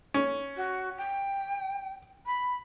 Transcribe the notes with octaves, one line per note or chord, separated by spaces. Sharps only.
C#4
F#4
G5
B5